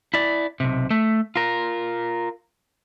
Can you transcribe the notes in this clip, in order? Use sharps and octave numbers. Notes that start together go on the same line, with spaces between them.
E4 D5
B1 C3
A3
F4 A#4